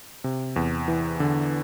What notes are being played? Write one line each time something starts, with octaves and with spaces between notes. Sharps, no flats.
C3
E2
E3
D3